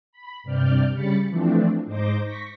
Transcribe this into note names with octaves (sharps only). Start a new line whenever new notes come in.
B5
G2 C3 D5 F6 G6
C#3 G3 B5 A6 C#7
E3 F3 A3 C4 D4
G#2 D#4 C5 D6 G6 A#6
C#6 A#6 B6